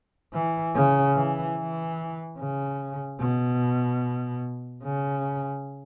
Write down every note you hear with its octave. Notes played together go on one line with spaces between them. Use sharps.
E3
C#3
E3
E3
C#3
B2
C#3